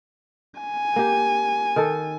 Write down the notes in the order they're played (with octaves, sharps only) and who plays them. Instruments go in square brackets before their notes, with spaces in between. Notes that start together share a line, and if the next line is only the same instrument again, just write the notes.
[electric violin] G#5
[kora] A#3 G4
D#3 A4